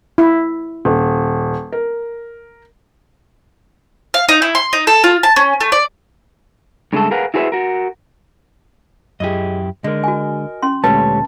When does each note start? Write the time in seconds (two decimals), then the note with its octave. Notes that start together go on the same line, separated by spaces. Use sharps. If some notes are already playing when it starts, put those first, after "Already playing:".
0.18 E4
0.85 D#1
1.73 A#4
4.14 F5
4.29 D#4
4.42 E4
4.55 C6
4.73 D#4
4.87 A4
5.04 F4
5.23 A5
5.36 C#4
5.61 A3
5.72 D5
6.93 G2 C#3 G#3 A3 A4
7.11 G#4 A#4 B4 F5 F#5
7.34 E4 F#4 G#4 B4 C5 E5
7.52 F#4 A#4
9.20 F#2 E4 G4 G#4 D#5
9.84 D3 G#3 A#4 D#5
10.04 F#4 G#5
10.62 C#4 C6
10.84 D2 A#2 G#3 A3 G4 B4 C#5 A5